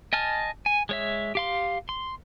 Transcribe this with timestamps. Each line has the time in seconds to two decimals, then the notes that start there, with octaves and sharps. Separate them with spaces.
0.13 D#5 G#5 A5 F6
0.66 G#5
0.89 G#3 C#5 E5
1.35 G4 F5 C6
1.89 C6